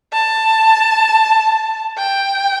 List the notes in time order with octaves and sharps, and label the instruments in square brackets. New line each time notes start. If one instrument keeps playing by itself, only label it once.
[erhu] A5
G5